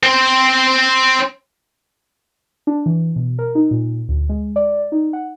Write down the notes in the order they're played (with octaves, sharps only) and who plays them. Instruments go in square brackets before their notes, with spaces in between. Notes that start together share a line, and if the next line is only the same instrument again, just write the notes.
[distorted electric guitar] C4 C5
[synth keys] D4
E3
B2
A#4
D#4
A#2
D2
G#3
D5
D#4
F#5